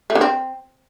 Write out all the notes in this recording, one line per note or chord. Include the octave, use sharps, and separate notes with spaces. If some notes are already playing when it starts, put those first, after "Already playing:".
A3
D3
C4